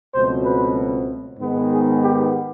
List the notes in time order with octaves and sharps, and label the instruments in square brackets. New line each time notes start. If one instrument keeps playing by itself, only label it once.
[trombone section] C#2 B2 F#3 A3 C4 C5
B4
G#2 D#3 G#3 B3
G#4
G4